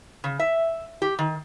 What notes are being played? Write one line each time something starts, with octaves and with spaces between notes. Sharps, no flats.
C#3
E5
G4
D#3